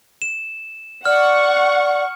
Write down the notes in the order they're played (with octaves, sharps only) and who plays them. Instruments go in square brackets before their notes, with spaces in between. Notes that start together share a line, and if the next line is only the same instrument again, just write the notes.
[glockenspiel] E7
[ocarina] D5 [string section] F#5 C#6 [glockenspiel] F6